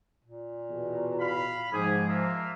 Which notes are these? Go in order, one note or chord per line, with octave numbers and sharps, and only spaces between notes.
A#2
E2 B2
F5 B5
G#2 F3 G4 G#4
A#3 F4 E5